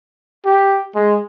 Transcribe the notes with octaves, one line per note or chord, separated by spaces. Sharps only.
G4
G#3